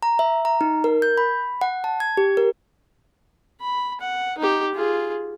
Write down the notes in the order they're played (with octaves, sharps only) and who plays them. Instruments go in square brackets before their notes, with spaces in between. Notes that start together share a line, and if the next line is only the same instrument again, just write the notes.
[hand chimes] A#5
E5
A#5
D#4
A#4
G6
B5
F#5
A5
G#6
G4
A#4
[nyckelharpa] B5
F#5
D#4 G4
F4 G#4